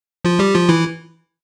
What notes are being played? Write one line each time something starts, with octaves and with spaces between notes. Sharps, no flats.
F3 F4
G3 G4
F3 F4
E3 E4